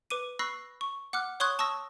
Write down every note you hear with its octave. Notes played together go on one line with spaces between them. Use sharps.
B4 D6 D#7
B5 C#6 E6 F#6 A#6 C7
C#6
F#5 D6 F6 F#6
C#5 C6 C#6 D#6 F#6 G#6
A5 C#6 D#6 E6 A#6